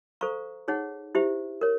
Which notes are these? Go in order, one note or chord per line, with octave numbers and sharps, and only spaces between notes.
A4 C5 F5 A#5 C#6
D#4 G#4 C#5 F#5
E4 G4 C5 E5
A#4 C#5